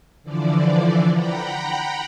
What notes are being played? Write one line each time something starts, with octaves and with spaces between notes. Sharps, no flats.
D3 E3 F3 D5
F#5 G5 A#5 B5